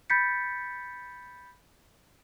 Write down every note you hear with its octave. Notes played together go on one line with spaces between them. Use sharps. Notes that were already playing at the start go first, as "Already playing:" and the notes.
B5 G6 A6 B6 C#7